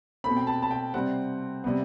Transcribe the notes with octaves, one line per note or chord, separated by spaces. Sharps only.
B2 A3 C4 B5
G5
A5
A5
G5
C3 G3 C4 F#5
C3 G3 B3